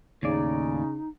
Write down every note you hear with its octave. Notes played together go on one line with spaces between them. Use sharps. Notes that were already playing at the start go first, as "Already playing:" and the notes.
D#2 A2 C#3 D#4 D5